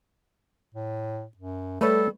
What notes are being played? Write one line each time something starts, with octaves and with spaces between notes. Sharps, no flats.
A2
F#2
G3 A3 A4 B4 C#5